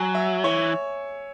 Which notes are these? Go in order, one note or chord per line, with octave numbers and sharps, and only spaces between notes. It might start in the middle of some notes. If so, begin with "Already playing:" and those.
Already playing: F#3 G#5
E5
E3 C#5